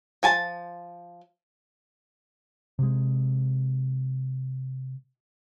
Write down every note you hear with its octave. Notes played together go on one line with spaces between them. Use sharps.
F3 G#5 A5
C3 G#3